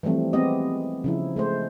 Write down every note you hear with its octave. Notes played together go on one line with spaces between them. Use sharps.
E3 F3 G3 A3 C4
G#3 B3 C4 G4 D#5
C#3 F3 E4
G#3 A3 C5